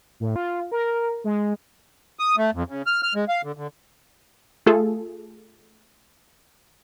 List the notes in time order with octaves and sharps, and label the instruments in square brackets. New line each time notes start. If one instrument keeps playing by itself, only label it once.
[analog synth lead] A2
F4
A#4
G#3
[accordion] D#6
A3
F2
C#3
F6
F6
G#3
F5
D3
D3
[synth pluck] A3 F4 G#4 A4